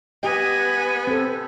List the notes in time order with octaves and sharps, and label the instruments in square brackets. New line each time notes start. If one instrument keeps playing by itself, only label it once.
[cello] B3 [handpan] G4 D#5 [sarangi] G#5
[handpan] C4 A4